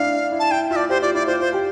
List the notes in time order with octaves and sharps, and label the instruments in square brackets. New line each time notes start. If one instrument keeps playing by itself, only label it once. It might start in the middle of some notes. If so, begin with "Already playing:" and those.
Already playing: [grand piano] D4 E4 [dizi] F5
[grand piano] E4
[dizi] A5
[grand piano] E4 [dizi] G5
[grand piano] F4 [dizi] E5
[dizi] D5
[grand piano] G4 [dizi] C5
[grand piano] F4 [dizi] D5
[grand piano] E4 [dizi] D5
[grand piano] F4 [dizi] C5
[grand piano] F4 [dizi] C5
[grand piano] G4